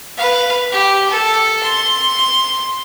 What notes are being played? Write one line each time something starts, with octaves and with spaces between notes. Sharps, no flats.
B4 F5
G4
A4
C6